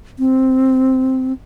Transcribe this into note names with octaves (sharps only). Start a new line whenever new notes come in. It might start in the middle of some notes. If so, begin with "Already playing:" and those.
C4